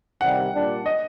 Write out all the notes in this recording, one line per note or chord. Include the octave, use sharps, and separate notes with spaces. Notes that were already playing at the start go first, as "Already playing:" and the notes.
C2 C3 D#3 G3 F#5
A#2 G3 D4
D#5